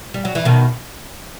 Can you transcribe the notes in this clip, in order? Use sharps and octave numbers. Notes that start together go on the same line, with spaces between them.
G3
F#3
E3
B2 D#3